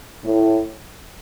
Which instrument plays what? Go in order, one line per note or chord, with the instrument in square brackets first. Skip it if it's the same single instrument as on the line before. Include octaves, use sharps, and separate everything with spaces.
[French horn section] A2